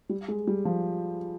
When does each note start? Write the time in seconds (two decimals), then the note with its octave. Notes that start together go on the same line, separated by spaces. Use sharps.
0.09 G3
0.28 G#3
0.47 G3
0.65 F3